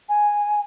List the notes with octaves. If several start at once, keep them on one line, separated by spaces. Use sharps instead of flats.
G#5